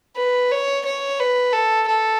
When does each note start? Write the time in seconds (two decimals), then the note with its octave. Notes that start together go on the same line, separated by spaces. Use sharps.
0.17 B4
0.52 C#5
0.85 C#5
1.20 B4
1.53 A4
1.88 A4